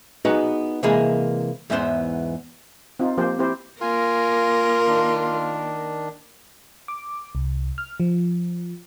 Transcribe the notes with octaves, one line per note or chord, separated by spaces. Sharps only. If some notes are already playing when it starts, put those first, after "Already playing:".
B3 D#4 F#4 G#4 B4 A#5
C3 E3 G#3 A#3 G#4 B5
E2 G#2 E3 B3 C5 C6
C4 D#4 F4
F3 A#3 G4 C5
C4 E4 G4 C5
A#3 F4 A#4 G#5
D#3 D4
D6
C2
F6
F3